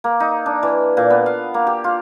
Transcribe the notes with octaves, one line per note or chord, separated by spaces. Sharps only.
A#3
D#4
D4
E3
A#2
B3
F5
A#3
G4
F4